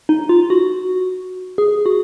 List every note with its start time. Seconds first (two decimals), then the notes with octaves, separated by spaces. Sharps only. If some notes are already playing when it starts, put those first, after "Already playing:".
0.09 D#4
0.29 F4
0.50 F#4
1.58 G#4
1.86 F#4